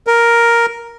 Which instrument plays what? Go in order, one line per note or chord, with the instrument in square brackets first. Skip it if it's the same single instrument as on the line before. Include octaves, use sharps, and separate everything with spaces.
[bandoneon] A#4